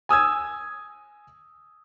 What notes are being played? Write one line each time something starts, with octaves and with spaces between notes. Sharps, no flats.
G#5 D#6 E6 G#6